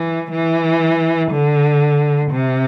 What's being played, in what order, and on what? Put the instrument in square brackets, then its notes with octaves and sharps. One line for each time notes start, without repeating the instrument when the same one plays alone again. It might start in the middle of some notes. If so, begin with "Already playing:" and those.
Already playing: [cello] E3
E3
D3
C3